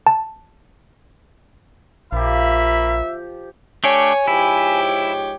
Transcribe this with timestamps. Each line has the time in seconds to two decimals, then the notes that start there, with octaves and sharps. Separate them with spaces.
0.07 A5
2.13 A#1 F3 A#3 G4 E5 B5
3.84 A3 D4 G4 C#5 G#5
4.28 G#2 F3 E4 G4 C#5